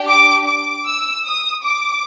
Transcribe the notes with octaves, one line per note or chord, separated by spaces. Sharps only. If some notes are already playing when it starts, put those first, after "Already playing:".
Already playing: D4 G4
D6
D6
E6
D#6
D6